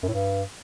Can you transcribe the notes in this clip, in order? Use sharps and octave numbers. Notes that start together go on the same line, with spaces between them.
F#2
A2
G2